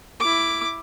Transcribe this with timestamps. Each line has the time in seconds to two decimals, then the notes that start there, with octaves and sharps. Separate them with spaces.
0.20 E4 D6